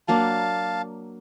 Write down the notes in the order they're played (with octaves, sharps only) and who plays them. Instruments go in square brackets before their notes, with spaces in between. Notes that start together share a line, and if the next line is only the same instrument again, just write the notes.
[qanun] F#3 A#3 D4 [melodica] F5 A5